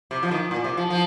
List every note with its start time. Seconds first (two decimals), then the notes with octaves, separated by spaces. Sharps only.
0.11 C3
0.23 F3
0.31 D#3
0.51 A#2
0.64 C3
0.77 F3
0.90 F3